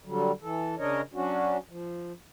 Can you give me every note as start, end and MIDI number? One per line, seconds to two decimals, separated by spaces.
0.05 0.32 50
0.05 0.32 54
0.05 0.32 55
0.42 0.75 52
0.42 0.75 69
0.78 1.01 49
0.78 1.01 62
0.78 1.01 70
0.78 1.01 73
0.78 1.01 75
1.14 1.57 54
1.14 1.57 61
1.14 1.57 62
1.14 1.57 66
1.69 2.12 53